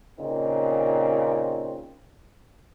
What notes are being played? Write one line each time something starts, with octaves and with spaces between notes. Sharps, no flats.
A#2 C#3 C4 D#4